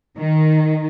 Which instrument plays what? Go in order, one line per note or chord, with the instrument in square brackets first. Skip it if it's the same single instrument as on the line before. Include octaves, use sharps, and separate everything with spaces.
[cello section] D#3